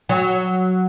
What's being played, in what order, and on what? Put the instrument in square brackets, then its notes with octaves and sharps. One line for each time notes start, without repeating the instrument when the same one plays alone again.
[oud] F#3